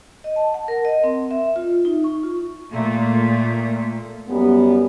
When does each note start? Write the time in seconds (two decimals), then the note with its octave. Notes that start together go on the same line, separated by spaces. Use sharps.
0.24 D#5
0.36 A5
0.54 F#5
0.68 A#4
0.85 D#5
1.04 C4
1.31 E5
1.56 F4
1.85 D#4
2.04 C#6
2.23 F4
2.71 A#2 A3
4.28 F#2 G3 B3